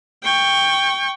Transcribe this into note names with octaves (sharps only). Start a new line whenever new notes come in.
G5 C#6